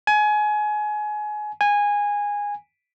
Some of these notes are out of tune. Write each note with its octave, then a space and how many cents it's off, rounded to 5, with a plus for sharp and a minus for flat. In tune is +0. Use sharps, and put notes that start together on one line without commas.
G#5 +25
G#5 -15